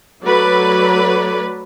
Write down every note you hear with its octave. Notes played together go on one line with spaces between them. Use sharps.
F#3 A3 A4 B4 D5